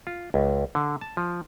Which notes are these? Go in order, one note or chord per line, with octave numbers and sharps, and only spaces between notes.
F4
C#2
D3
A5
F3